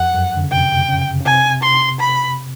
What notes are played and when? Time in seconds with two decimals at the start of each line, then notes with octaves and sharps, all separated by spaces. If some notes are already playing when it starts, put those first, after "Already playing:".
Already playing: F2 F#5
0.14 F#2
0.37 D3
0.44 C#3
0.52 C3 G5
0.89 C#3
1.20 C#3
1.26 C3 G#5
1.63 C6
2.00 B5